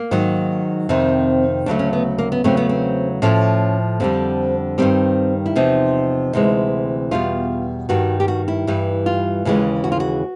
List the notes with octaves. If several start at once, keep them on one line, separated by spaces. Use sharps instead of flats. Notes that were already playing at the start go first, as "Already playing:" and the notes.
Already playing: A#3
G#2 D#3 F#3
F2 C3 D#3 C4
D2 C#3 F#3 A3 D4
C#4
B3
A#3
B3
E2 C#3 F#3 A3 C4
B3
C4
A2 F3 A3 C#4
F2 D3 G3 C4
G2 D#3 G3 C4
E4
E2 C3 F3 D#4
D2 C3 E3 G#3
E2 B2 G3 F4
G2 D#3 G3 F#4
G4
F#4
E4
G2 E3 G3
F4
D#2 C#3 E3 G#3
F#4
F4
F#4